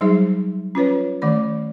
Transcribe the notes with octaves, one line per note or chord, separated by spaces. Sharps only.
F#3 G3 D#4 G#4 C5 E5
C#4 F4 B4 C#5
D#3 A3 D5 B5